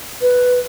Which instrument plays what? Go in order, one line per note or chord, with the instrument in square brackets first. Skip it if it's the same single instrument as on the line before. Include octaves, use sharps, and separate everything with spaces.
[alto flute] B4